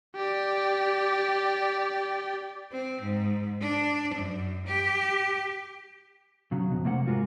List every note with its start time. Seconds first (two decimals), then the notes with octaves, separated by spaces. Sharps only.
0.16 G4 D5
2.71 C4
3.01 G#2
3.61 D4
4.14 F#2
4.66 G4
6.52 C#3 F#3
6.69 F2 B2
6.85 C3 A3 A#3 C5 F#5
7.07 G#2 G#3 A#3 F4 F#4